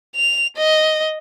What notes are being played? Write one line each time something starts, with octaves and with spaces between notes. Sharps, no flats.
F7
D#5